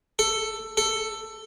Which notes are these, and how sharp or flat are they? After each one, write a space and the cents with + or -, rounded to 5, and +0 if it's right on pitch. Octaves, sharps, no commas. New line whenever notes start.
A4 +10
A4 +10